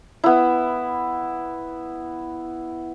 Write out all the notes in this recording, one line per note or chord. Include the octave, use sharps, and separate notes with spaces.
B3 E4